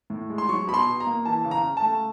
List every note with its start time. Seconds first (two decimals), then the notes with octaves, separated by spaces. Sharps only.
0.10 A2
0.30 G#3
0.38 C6
0.49 F#3 C#6
0.67 B2 B5
0.74 C6
0.86 B2
1.00 A#5
1.07 A#3
1.25 E3 A5
1.45 C#3
1.51 A#5
1.63 C#3
1.77 A5
1.82 A3